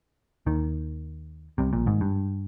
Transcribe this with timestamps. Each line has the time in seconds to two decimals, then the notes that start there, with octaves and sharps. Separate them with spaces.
0.46 D#2 D#3
1.58 C2 C3
1.73 A#1 A#2
1.86 G#1 G#2
2.01 G2